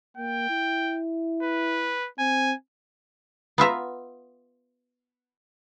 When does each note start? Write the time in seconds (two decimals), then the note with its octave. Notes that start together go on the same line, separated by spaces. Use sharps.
0.17 A#3 G5
0.50 E4
1.43 B4
2.19 C4 G#5
3.58 B3 F4 E5 A#5